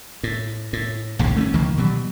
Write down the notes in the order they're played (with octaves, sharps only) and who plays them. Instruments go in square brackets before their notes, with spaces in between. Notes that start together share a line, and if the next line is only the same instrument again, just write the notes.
[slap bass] A2
A2
A#1 D#2 C#3
A3 B3 C#4
C#2 D#3 F3 A#3
B2 E3 F#3 G3